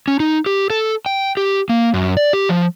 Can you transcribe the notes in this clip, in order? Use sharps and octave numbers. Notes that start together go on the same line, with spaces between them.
C#4
D#4
G4
A4
G5
G4
A#3
F#2
D5
G4
F3